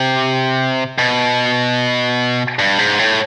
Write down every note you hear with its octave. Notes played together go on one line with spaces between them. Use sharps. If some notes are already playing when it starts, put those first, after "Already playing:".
Already playing: C3
B2
G2
G#2
A2